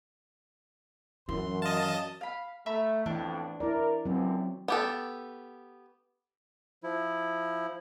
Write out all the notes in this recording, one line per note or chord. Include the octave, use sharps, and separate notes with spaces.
F#2 E3 C6
D#5 F5 A5
F5 B5
A3 E5 A#5 B5
F2 A2 E3 D4
E4 A#4 D5
C#2 F#2 F#3 C4
B3 G4 A4
F3 E4